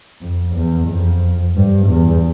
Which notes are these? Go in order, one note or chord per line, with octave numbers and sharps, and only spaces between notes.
F2
E2
F2
G2
E2